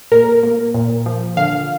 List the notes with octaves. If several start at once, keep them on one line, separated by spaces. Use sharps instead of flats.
A#2 A#4
A#3
A#2
F3
D3 F5